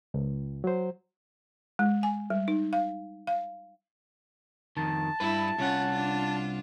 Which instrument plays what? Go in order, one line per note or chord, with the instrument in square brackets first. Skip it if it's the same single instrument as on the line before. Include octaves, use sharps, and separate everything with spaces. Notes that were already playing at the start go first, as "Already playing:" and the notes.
[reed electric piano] C#2
F#3 C5
[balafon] G#3
G#5
G3
D#4
F5
F5
[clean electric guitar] F2 D#3 [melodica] A5
[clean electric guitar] G2 B4 [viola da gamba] E4
[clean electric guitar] C2 F#5 [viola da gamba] C#4 F4
[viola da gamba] D4 F4